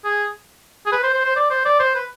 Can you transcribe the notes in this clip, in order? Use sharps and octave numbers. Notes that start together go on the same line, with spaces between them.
G#4
G#4
B4
C5
C5
C5
D5
C5
D5
C5
B4